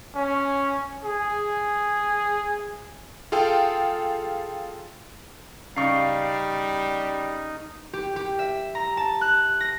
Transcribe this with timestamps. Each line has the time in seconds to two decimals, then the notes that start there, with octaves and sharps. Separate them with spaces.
0.15 C#4
1.04 G#4
3.32 F4 G#4 A4 F5 G5
5.76 C#3 G3 D#4 D5 F5 C#6
7.93 G4
8.16 G4
8.39 E5
8.75 A#5
8.97 A5
9.21 F#6
9.60 A#6